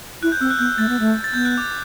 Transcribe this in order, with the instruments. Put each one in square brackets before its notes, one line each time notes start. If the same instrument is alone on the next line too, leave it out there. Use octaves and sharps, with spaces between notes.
[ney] E4 [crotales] F#6
[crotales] G6
[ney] C4 [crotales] E6
[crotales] F#6
[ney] B3 [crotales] G6
[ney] A3 [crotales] A6
[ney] B3
A3
[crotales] A6
[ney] B3 [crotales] G6
[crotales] F#6
D6